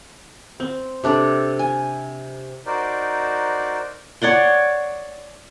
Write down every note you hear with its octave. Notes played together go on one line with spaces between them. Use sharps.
C4
C3 D4 A4 D5
G#5
D#4 F#4 A#4 C5 D5
C#5 D5 F#5 C6